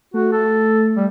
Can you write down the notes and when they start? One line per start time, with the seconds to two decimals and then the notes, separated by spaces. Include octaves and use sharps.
0.14 A3 F#4
0.32 A4
0.97 G3